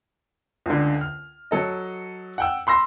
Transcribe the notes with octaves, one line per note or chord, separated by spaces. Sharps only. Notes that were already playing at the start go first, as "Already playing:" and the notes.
C#2 D3
F6
F#3 A4 D#5
F#5 G5 E6
B5 C6 E6 A#6